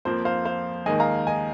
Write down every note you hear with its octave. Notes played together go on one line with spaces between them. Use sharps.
F2 F3 A#3 C5
C5 F5
C5 F5
D#2 D#3 G#3 D#5 G#5
F5 A#5
D#5 G#5